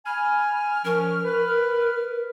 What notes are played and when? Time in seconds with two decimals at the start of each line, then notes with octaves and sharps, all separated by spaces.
0.06 G#5 B5 F6
0.85 F3 C#4 A#4
1.24 B4